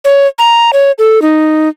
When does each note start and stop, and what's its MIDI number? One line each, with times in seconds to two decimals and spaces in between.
0.05 0.27 73
0.38 0.71 82
0.73 0.92 73
0.99 1.22 69
1.22 1.69 63